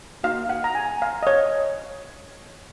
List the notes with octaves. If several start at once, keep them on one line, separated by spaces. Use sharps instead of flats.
A#3 D#4 F#4 F5
F#5
A#5
G#5
F5
D#5
C#5